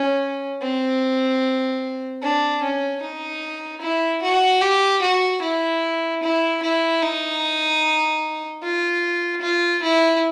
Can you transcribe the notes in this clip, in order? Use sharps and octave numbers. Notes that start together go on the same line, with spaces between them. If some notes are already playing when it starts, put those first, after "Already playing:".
Already playing: C#4
C4
D4
C#4
D#4
E4
F#4
G4
F#4
E4
E4
E4
D#4
F4
F4
E4